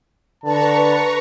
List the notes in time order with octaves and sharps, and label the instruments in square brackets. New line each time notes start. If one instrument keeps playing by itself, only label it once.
[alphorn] D3 [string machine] B4 A#5 C#6 [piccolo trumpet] A5